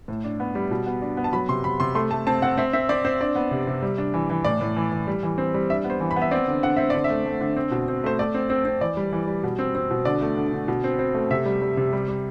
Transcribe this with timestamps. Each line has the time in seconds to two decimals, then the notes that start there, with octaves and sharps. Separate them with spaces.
0.08 A2
0.24 D4
0.40 B3
0.55 G3
0.71 B2
0.86 B3
1.02 D4
1.17 B3
1.24 A5
1.33 F#3 B5
1.49 C3 C6
1.64 C3 B5
1.80 C3 C6
1.95 A3 C6
2.11 A3 A5
2.27 C4 A5
2.42 C4 F#5
2.58 C4 E5
2.73 C4 E5
2.89 C4 D5
3.05 C4 C5
3.20 D4 D5
3.35 B3
3.51 C3
3.67 C3
3.82 G3
3.98 D4
4.14 E3
4.30 E3
4.45 A2 D5
4.61 A2
4.76 E3
4.92 E3
5.07 G3
5.23 E3
5.38 C4
5.54 G3
5.70 D4 E5
5.84 B3
5.90 C5
6.00 E3
6.11 B5
6.16 B3
6.22 E5
6.31 C4 D5
6.48 D3
6.63 D3 F#5
6.76 C4 E5
6.90 D3 D5
7.04 E5
7.10 A3
7.25 A3
7.41 D3
7.57 C4
7.71 B2
7.88 C4
8.04 A3 C5
8.19 A3 D5
8.34 C4
8.50 C4
8.65 C4
8.81 E3 D5
8.97 G3
9.12 E3
9.27 G3
9.44 B2
9.59 C4
9.75 C4
9.90 B2
10.05 D3 D5
10.21 A3
10.37 D3
10.53 D3
10.68 B2
10.84 C4
10.99 C4
11.14 A3
11.31 C3 E5
11.46 G3
11.62 G3
11.77 C3
11.93 G3
12.08 G3